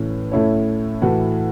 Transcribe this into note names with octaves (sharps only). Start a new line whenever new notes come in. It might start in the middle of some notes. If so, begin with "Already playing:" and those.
Already playing: A2 E3 C#4
A2 A3 C#4 E4 C#5
A2 E3 A3 F#4 A4